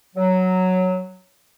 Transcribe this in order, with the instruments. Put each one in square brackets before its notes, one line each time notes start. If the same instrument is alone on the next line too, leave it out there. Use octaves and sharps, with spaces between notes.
[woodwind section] F#3